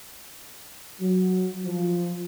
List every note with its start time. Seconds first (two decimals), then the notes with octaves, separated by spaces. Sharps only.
1.01 F#3
1.64 F3